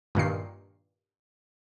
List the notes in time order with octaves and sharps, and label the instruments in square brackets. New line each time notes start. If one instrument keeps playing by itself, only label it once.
[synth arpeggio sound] G2 A#2 D#3 C7